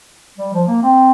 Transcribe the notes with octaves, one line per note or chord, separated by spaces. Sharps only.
G3
F3
A#3
C4